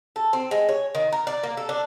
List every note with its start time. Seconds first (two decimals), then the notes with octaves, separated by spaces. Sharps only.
0.16 A4
0.33 C4
0.51 G#3
0.69 C#5
0.95 D#3
1.12 A#4
1.27 D5
1.43 A#3
1.57 A4
1.69 D4